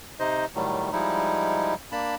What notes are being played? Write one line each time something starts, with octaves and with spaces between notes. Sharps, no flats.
C3 D#4 C5 D#5
A2 D#3 F#3 G3 A3
F3 G3 G#3 D#4 E4
A#3 D4 A5 B5